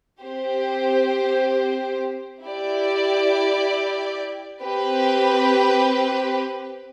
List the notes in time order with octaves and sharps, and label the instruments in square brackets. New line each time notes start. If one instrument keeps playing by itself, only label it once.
[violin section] C4 G4 C5
E4 G4 D5
C4 G4 B4